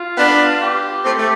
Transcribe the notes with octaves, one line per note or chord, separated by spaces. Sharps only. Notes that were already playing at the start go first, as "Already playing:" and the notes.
Already playing: F4
B3 D4
G4
A3 C4
A3